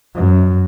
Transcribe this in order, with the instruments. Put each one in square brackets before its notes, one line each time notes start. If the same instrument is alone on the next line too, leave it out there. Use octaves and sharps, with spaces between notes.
[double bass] F#2